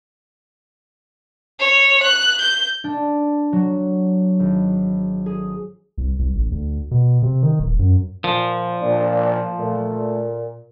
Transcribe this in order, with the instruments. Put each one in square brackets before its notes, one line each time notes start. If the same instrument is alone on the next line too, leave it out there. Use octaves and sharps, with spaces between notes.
[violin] C#5
F#6
G6
[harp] D4
F#3
G#1
G#4
[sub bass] C2
C2
A1
D2
B2
C3
D#3
D#1
F#2
[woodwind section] A#2 [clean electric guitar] F3
[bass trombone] A#2 [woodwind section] D4 D5
[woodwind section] A#2 [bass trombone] A3